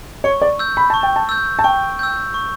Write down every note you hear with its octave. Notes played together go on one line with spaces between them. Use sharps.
C#5 C#6
D5
E6 G6
B5
A5 C#6
G5
A5
E6 G6
A5
G5 C#6
E6 G6
C#6